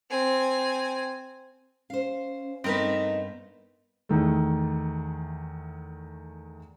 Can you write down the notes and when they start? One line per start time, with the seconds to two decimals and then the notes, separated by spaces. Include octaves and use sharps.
0.10 C4 G#5
1.90 C#4 C5 F5
2.64 G2 A3 B3 C4 D#4 A#4 B4
4.09 E2 D#3 A3